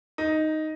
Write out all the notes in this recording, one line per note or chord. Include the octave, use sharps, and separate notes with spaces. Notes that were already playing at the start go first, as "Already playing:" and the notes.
D#4